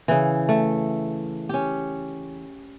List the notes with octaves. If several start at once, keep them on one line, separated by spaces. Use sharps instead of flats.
C#3 E3
A3
C#4 G4